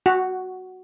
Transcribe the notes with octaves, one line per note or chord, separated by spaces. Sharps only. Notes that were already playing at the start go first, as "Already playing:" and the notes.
F#4